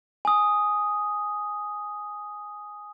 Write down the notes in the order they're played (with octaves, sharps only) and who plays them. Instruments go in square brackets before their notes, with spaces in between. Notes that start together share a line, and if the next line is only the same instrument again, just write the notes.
[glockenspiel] G#5 D#6